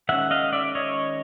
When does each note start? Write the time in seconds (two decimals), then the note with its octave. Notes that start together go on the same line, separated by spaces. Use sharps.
0.09 D#3 G#3 C#4 E5 F#5
0.31 D#5 F5
0.53 D5 E5
0.75 C#5 D#5